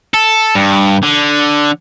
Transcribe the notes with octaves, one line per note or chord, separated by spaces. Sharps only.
A4
G2
D3